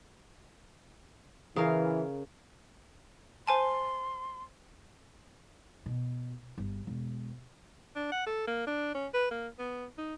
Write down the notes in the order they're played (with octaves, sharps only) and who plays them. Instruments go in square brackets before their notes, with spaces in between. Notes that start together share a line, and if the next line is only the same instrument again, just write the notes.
[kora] C#3 A#4 F5 [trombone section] E3
[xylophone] C5 G#5 A5 [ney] C6
[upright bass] B2
G1
E1
[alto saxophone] D4
F#5
A4
A#3
D4
C#4
B4
A#3
B3
D#4